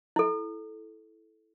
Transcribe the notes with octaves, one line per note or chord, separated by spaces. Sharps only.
E4 A4